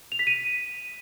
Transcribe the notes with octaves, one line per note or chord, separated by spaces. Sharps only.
F7
B6
D#7